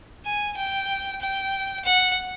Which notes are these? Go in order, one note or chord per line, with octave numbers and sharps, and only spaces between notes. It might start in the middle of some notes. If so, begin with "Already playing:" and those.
G#5
G5
G5
F#5